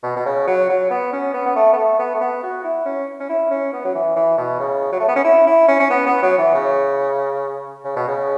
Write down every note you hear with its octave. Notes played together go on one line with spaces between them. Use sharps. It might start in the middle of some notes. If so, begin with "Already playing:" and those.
B2
B2
C#3
F#3
F#3
B3
C#4
B3
B3
A3
B3
A3
B3
A3
B3
F#4
E4
C#4
C#4
E4
C#4
B3
F#3
E3
E3
B2
C#3
F#3
A3
B3
C#4
E4
E4
C#4
C#4
B3
B3
F#3
E3
C#3
C#3
B2
C#3